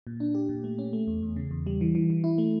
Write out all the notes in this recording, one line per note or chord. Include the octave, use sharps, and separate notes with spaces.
A#2
D4
G4
A#2
A3
C#4
A3
E2
E2
C#3
E2
G3
E3
E3
E3
E4
A3